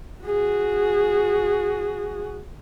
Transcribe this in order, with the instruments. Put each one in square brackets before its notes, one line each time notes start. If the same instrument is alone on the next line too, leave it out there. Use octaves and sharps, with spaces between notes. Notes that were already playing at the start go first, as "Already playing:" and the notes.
[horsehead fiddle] F#4 G#4